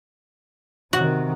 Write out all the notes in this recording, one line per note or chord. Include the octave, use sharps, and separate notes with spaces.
C3 D#3 F#4